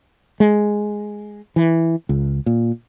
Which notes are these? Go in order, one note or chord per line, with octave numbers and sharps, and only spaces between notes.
G#3
E3
C#2
A#2